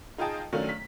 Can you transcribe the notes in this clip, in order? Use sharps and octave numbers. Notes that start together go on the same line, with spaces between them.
D#4 F4 G#4 D#5 G5 A5
D#3 F#3 A3 C#4 D4 F4
B6